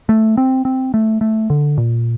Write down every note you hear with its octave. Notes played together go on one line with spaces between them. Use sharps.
A3
C4
C4
A3
A3
D3
A#2